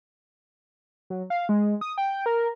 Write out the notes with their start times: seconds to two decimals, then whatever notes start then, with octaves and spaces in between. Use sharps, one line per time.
1.10 F#3
1.30 F5
1.49 G#3
1.81 D#6
1.98 G5
2.26 A#4